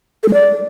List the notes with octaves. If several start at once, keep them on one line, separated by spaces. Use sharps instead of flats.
A4
G#3
D5